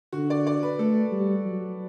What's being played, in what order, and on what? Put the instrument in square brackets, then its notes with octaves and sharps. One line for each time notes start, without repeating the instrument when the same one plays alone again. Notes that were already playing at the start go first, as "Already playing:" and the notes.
[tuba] D3 [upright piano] F#4
[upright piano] D5
D5
B4
[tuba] A3 [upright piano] A4
[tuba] G3
F#3